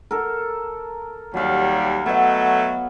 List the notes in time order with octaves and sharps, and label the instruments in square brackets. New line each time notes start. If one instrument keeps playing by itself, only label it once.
[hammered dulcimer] A4 A#4
[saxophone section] D#2 G3 [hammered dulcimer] F#3 F5
[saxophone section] F#3 A3 [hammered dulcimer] B3 D#5